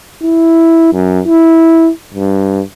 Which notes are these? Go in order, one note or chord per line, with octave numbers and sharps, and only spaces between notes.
E4
F#2
E4
G2